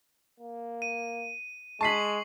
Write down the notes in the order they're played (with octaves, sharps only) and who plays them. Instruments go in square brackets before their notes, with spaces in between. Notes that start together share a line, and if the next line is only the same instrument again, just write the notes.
[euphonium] A#3
[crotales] D#7
[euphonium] G#3 [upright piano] A5 B6 [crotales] C#6 C7 F#7